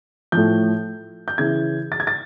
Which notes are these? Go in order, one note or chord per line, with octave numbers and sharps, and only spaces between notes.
A2 F3 G6
G6
C#3 E3 G#6
A6
G#6
A6